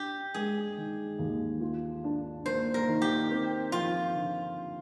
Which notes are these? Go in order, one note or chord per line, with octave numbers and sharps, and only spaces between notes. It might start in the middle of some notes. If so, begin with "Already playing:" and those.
Already playing: D4 G4
G#3 G#4
D#3
D#2
F4
D4
A#3 C5
A#4
D#3
G4
C4
F3 F4
D3